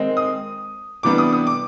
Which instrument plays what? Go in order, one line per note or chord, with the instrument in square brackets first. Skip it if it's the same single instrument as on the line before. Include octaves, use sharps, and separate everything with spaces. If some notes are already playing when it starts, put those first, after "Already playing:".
Already playing: [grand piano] D#3 G#3 C4 D#4
D#6
C3 E3 G3 B3 D4 D6
D#6
D#6
D6